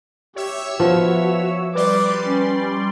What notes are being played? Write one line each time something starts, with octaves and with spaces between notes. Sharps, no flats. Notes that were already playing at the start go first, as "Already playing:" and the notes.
G4 C#5 E5 E6
F3 B3 F#4
G3 B4 D5 C6 D6
C#4